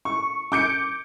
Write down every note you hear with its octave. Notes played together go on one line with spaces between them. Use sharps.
C#6
D6 G6 C#7 D7